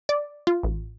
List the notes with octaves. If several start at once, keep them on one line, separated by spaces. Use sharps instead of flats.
D5
F4
A1